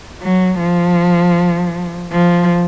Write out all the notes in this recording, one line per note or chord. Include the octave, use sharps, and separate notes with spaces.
F#3
F3
F3